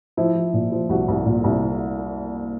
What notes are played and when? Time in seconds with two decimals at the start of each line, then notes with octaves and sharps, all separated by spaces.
0.17 F3 E4
0.35 F3
0.53 A#2
0.72 F3
0.89 C2 F#4
1.08 C2
1.26 A#2
1.44 C2